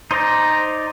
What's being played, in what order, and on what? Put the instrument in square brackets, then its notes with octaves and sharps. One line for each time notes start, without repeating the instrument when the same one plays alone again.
[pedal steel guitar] D#4 C5 D5 A#5